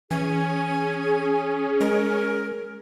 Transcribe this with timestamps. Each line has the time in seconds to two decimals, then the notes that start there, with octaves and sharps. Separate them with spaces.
0.11 E3 C#4 G#4 G#5
1.81 G#3 A#4